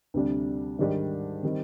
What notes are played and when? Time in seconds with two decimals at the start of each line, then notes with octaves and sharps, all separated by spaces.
0.14 D2 C3 G3 D4
0.79 G#2 D#3 G3 D4 G4
1.43 D#3 G3 C4 D#4